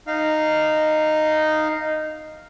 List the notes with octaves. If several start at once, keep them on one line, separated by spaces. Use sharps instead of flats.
D#4 F5